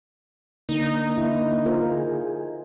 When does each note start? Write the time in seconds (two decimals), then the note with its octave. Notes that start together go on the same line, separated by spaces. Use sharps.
0.69 D3 A#3 D#4
1.17 E4
1.65 F4 A#4 C5
1.91 G#4